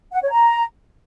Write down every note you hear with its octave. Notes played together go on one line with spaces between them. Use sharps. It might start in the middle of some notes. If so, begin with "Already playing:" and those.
F#5
C#5
A#5